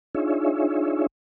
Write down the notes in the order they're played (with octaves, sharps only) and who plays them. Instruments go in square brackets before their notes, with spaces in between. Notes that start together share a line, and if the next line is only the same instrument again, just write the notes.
[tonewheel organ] D4 D#4 F4 G#4 C#5 E5